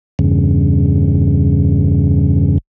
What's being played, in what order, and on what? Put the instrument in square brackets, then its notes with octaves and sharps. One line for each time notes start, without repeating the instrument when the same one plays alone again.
[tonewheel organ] E2 G2 C#3